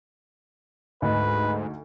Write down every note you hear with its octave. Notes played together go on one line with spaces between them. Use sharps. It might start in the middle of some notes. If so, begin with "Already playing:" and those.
D2 G#2 D#4 B4